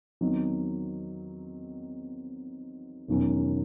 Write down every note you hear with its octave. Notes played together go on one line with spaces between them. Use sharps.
E2 D#3 F#3 C4 D#4
E1 E2 D#3 F#3 C#4